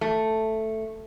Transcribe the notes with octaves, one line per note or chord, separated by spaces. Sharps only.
A3